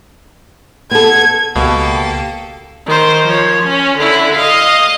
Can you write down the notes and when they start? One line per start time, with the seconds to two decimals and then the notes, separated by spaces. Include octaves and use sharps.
0.91 B3 A4 G#6
1.56 C#2 B2 A#3 G4 A4
2.87 D#3 C5
3.24 F3 C#5
3.64 C#4
3.99 D3 E4
4.36 D#5 F5